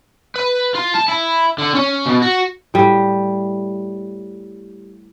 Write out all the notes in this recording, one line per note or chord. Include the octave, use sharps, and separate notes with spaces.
B4
F4
A5
E4
D3
C#4
B2
F#4
A2 G3